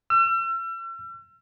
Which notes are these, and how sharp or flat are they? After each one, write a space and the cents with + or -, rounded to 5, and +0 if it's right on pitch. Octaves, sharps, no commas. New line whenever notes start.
E6 +45